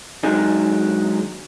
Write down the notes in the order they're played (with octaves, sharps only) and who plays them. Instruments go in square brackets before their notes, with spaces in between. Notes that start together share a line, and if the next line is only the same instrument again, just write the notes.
[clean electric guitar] D#3 F#3 G#3 D4 D#4 G#4